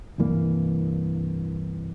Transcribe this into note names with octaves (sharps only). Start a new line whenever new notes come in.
C2 G2 E3 A#3